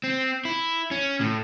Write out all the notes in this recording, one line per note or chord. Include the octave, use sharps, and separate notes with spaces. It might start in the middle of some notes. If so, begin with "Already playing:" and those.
C4
E4
C#4
A2